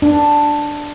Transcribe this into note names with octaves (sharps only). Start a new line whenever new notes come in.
D4